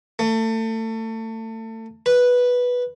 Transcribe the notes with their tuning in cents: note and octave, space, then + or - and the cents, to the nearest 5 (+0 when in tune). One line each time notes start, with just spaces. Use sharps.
A3 +30
B4 -5